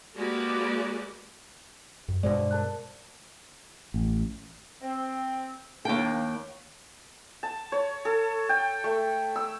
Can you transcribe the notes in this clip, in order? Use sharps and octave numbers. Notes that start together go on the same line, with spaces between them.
G#3 A#3 F#4 G4 B4 D5
F#2
G2 B2 G#3 C5 D5
A#4 A5 F#6
A1
C4
D#2 A#3 D4 G5
A5
C#5
A4
G5
A3
E6